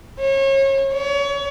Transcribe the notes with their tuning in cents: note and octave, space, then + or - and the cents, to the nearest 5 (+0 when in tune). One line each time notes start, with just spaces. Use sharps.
C#5 -30
C#5 +30